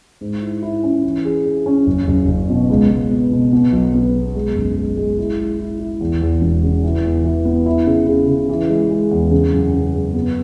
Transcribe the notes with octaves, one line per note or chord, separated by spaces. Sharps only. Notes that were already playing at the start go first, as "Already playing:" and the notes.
G#2
E4
E4
C#4
E3
G#4
G#4
C#4
F#1
F#1
F#1
B2
C#2
C#2
B3
B2
B2
B1
B3
B2
G#3
F#1
G#3
G#3
E4
G#3
E4
E4
E2
E2
E1
C#3
E3
E2
E3
B3
E4
C#3
C#3
C#3
E3
G#3
G#3
E2
C#3
F#2
C#3
F#2
B3